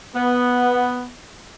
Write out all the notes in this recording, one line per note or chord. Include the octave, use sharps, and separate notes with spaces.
B3